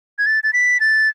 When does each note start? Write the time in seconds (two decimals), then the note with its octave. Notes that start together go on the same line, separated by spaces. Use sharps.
0.19 G#6
0.26 A6
0.44 A6
0.53 B6
0.80 A6